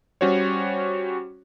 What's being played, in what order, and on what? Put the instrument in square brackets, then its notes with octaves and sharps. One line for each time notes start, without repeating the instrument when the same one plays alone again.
[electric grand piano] G3 C#4 F#4 C5 C#5